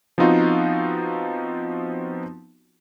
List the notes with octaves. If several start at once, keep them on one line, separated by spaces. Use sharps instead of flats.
F3 B3 C4 D#4 F4 F#4